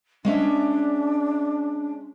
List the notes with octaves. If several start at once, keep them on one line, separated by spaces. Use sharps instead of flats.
G#3 C#4 D4 E5